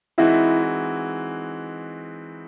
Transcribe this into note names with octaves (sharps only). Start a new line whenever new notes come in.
E3 G#3 C4 D#4 E4 F#4